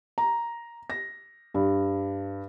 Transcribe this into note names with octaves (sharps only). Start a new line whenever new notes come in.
A#5
A#6
G2